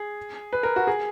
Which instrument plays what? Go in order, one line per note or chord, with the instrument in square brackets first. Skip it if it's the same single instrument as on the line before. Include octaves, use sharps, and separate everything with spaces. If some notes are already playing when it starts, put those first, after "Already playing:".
Already playing: [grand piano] G#4
B4
A#4
F#4
G#4